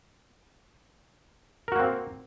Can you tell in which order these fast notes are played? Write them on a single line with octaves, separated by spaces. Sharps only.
A#4 F#4 A#3 C4